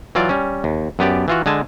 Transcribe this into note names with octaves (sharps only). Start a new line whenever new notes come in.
E3 F#3 F4 D5
G3 C#4
D#2
F#2 B3 G4 D5
E3 F4 F#4
D3 G#3 G#5 A5